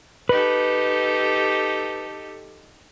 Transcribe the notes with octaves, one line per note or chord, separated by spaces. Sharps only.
D#4 G4 A4 B4